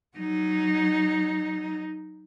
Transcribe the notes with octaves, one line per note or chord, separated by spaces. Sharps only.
F#3 D#4